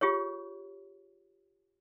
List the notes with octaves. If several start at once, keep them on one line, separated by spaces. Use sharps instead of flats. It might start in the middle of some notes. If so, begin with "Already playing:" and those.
F4 G4 G#4 C#5